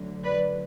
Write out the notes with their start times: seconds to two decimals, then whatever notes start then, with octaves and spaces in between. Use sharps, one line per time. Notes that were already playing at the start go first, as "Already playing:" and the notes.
Already playing: D2 D3 F#3
0.24 B4 D5